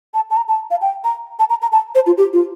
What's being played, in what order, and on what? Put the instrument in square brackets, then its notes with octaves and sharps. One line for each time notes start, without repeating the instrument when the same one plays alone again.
[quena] A5
A5
A#5
A5
F5
G5
A#5
A5
A#5
A#5
A5
C5
F4
G4
F4